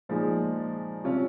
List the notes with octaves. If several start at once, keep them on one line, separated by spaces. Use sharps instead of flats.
A#2 F3 G#3 D#4 G#4
C3 G3 C#4 F4